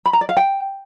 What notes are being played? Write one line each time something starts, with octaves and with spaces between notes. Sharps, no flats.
B5
A#5
D5
F5
G5